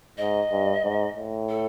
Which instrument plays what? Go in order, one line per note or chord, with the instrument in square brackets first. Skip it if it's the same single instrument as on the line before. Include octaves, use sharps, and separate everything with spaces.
[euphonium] G#2 [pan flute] D#5
[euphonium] G2
G#2
A2
[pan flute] A4